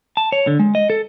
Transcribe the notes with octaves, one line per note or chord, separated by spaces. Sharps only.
A5
C#5
D3
G#3
D#5
A4